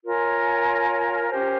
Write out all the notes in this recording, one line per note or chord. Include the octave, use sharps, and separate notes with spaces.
F4 A#4 C#5 G#5
C#4 G4 C5